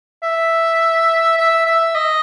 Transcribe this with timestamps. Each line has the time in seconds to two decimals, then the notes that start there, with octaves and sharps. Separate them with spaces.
0.23 E5
1.38 E5
1.66 E5
1.95 D#5